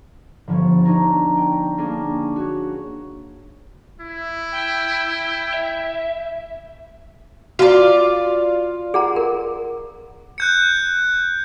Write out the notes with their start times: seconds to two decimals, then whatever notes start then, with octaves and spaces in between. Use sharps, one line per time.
0.47 G1 F3 C#5 C#6
0.85 D4 D#4 C#5 A#5
1.37 G5
1.78 A#3 C#4 D4 G#4
2.36 F#4 C#5
4.00 E4
4.52 G5
5.54 E5
7.59 F4 F#4 D5 F5 A#5
8.94 G#4 F#5 A#5
9.16 A#4
10.38 F#6 G6 C#7